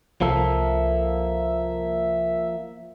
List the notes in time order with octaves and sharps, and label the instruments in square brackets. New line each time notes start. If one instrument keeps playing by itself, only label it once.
[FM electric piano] C2 [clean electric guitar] F3 A#3 A4 [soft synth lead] E5